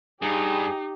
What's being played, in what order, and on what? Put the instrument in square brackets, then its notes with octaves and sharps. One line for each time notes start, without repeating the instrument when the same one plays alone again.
[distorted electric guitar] G2 [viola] D#4 [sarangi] G4 [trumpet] G#4